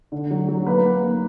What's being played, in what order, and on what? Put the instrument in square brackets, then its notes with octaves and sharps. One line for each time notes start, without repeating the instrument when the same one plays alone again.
[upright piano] D3
F#3
F#3
A#3 B4
A#3
A#3